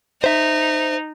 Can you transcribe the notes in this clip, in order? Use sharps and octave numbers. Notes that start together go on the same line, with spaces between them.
D#4 C5 E5